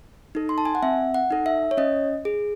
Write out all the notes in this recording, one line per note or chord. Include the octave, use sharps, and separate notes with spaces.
D#4 A4
C6
A5
G#5
F#5
C4 E5
F#5
D#4 A4
E5
C#5
C#4 D#5
G#4